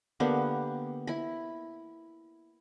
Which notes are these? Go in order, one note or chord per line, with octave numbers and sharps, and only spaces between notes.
D3 A#3 B3 G4
E4 B5